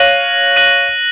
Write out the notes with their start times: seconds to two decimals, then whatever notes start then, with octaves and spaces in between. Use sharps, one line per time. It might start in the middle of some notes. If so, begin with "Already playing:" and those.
Already playing: C#5 F5 F#6 A#6 D#7 F#7
0.56 F#6 A#6 D#7 F#7